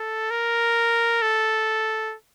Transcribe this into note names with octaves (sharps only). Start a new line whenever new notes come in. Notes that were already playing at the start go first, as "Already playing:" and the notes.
Already playing: A4
A#4
A4